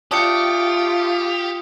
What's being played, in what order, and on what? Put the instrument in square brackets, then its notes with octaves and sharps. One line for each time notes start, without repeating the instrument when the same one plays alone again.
[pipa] A3 D4 G5 [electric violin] F4 [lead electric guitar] G4 [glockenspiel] D#6 C#7